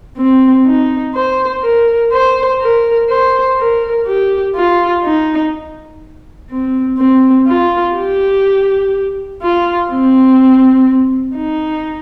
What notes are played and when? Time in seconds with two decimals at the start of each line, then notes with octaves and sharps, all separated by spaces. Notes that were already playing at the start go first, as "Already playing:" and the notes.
0.17 C4
0.66 D#4
1.15 C5
1.63 A#4
2.12 C5
2.61 A#4
3.09 C5
3.58 A#4
4.06 G4
4.55 F4
5.04 D#4
6.50 C4
6.98 C4
7.47 F4
7.95 G4
9.42 F4
9.90 C4
11.36 D#4